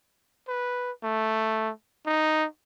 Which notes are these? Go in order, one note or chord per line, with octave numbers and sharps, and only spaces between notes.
B4
A3
D#4